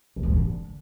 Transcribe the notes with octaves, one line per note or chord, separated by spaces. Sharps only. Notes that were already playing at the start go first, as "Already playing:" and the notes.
A2
G#2
G2
D3